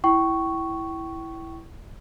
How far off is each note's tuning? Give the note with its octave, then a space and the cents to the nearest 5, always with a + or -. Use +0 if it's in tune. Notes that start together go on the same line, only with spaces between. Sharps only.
E4 +0 G5 -30 C#6 +0